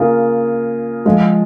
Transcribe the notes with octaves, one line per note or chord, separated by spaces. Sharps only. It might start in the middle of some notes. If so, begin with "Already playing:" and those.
Already playing: C#3 A#3 F4 G#4
F3 G#3 F4